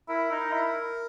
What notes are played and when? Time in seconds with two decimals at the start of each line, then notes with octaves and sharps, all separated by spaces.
0.08 E4 A#4
0.32 D#4
0.53 E4